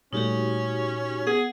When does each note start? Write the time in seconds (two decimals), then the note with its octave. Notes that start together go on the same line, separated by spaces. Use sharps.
0.13 A#2 G3 A3 C#4 D#4 F#4 G4
1.27 B3 G#4 F#5